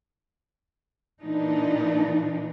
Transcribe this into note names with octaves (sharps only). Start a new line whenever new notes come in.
A#2 E3 D4 D#4